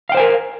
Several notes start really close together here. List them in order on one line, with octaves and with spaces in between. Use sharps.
F5 G5 C5 G#5 A#4